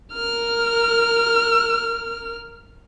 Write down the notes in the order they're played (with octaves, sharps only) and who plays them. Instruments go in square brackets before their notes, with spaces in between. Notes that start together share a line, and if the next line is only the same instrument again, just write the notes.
[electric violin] A#4 F6